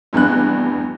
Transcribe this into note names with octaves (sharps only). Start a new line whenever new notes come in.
F1 E2 G2 D4 F#6